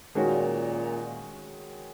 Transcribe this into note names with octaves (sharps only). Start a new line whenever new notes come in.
A#2 D#3 G#3 C#4 F#4